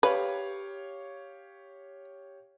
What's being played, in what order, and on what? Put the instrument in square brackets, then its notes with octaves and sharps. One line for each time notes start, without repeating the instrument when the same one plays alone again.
[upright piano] G4 C#5 F5 [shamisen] B4